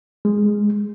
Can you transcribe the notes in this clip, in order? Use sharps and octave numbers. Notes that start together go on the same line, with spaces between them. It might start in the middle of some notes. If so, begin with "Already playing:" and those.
G#3